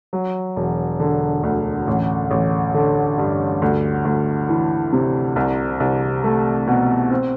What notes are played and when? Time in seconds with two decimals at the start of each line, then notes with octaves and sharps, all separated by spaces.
0.13 F#3
0.56 E1
1.00 D3
1.43 D2
1.87 A1
2.31 A1
2.74 D3
3.18 G2
3.62 D2
4.05 D2
4.49 E3
4.92 C3
5.36 C2
5.80 C2
6.24 A3
6.67 B2
7.11 C4